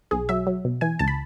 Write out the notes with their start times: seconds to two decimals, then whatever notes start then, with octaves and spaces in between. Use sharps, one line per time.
0.11 B1 G#4
0.29 F#3 E5
0.47 F#3
0.65 B2
0.81 E3 G#5
0.99 C#2 A5
1.08 B5